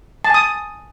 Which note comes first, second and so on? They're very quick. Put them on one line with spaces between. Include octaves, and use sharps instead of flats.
A5 G#5 D#6